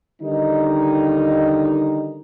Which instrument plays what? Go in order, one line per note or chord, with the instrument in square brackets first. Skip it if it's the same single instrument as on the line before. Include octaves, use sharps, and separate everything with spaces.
[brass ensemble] D3 D#3 G3 D#4